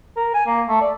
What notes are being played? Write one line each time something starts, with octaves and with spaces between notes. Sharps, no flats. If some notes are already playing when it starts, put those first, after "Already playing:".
A#4
G#5
A#3
A3
D5